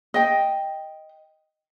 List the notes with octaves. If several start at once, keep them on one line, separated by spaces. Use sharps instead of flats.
D#5 G5